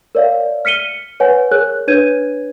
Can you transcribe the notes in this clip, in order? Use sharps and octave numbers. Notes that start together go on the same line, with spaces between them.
A#4 C#5 D5 E5 F5
F6 B6 C#7 D#7 G7
B4 C#5 F#5 G#5
G#4 A#4 C#5 F#6
D4 B4 C#5 G6 G#6 D#7